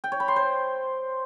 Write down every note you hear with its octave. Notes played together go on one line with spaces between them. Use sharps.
G5
C#5
B5
C6
C5